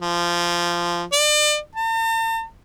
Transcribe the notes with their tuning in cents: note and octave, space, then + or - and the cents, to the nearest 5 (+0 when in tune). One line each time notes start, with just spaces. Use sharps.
F3 -15
D5 +35
A5 +45